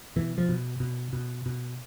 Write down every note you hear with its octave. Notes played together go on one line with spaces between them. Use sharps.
B2 E3
F3
B2
B2
B2
B2